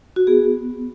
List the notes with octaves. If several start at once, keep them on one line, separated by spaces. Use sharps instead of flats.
F#4
B3 F#4 G#4